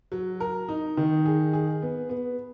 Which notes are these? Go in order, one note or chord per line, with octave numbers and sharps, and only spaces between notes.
F#3
A#4
D#4
D#3
G#4
G#4
B3
B3